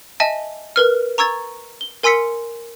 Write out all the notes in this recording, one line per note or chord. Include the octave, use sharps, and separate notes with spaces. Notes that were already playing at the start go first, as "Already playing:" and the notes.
D#5 E5 G#5 A5
A#4 B4 F6
A#5 C#6 E6 G#6 A6
G7
A#4 G#5 C6 E6 B6 C#7